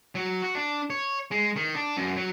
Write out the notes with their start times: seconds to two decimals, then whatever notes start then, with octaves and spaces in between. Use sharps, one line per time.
0.15 F#3
0.42 F#4
0.55 D4
0.90 C#5
1.31 G#3
1.56 D#3
1.75 D4
1.97 F#2
2.16 F#3